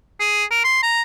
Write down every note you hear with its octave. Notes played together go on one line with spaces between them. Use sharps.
G#4
A#4
C6
A#5